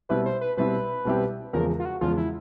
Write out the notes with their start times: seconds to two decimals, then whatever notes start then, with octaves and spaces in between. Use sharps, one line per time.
0.09 B2 G3 C4 E4 G4 B4
0.26 C5
0.41 B4
0.57 B2 G3 C4 E4 G4 B4
1.05 B2 G3 C4 E4 G4
1.53 E2 C#3 F3 G#3 A#4
1.80 F4
1.85 F#4
2.01 E2 C#3 F3 G#3 F4
2.17 E4